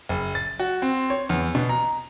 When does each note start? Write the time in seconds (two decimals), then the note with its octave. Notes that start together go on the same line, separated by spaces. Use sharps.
0.09 F#1
0.35 A6
0.59 F#4
0.82 C4
1.10 C#5
1.29 E2
1.55 B2
1.69 A#5